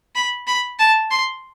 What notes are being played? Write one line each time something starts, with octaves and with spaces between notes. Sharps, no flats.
B5
B5
A5
C6